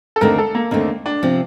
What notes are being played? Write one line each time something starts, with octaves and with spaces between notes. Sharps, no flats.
A4
D#2 D3 A3 C4 A#4
A4
A#3
D#2 D3 A3 A#3 C4
D4
C3 F3 C4